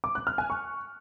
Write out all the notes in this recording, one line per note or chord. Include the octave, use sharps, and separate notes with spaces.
D6
F#6
F6
G#5
C#6